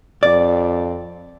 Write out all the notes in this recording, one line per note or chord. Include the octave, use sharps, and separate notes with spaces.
F2 D5